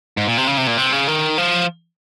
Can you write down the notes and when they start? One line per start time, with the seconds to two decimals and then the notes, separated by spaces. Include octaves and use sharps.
0.17 G#2
0.27 A#2
0.38 C3
0.47 C#3
0.57 C3
0.67 A#2
0.78 C3
0.92 C#3
1.08 D#3
1.38 F3